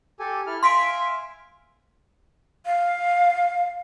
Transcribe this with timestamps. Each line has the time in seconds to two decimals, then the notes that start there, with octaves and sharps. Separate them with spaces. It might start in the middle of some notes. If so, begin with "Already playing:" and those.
0.20 G4 A4 G#5
0.47 E4 A4 F6
0.63 E5 F5 G#5 C6 B6 D7
2.66 F5